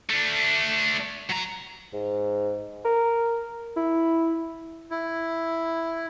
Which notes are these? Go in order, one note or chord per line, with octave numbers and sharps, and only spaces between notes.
A3 D4
F#3 A#5
G#2
A#4
E4
E4